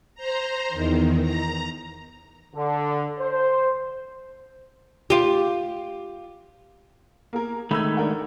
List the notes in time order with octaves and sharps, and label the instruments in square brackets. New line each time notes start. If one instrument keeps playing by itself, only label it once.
[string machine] C5 A#5
E2 D#3
A#5
[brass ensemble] D3
C5
[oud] F4 G4
[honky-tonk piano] A#3 G#4 A#4
[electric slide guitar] D#3 G#3 A3 [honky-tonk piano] B5 E6 G#6
[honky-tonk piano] D4 A#4 F#5